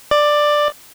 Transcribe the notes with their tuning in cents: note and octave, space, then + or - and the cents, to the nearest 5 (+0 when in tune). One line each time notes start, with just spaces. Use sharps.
D5 +10